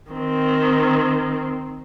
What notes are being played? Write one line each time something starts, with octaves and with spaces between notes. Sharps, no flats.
D#3 C4